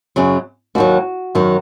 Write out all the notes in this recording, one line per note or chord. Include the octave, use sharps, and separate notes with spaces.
F#2 C#3 F#3
D#2 D#3 F#3 F#4
F#2 D#3 F#3